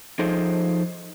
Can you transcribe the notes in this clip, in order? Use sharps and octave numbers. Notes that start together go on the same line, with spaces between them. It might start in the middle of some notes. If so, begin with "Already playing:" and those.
F3 D#4 G#4 A4 C5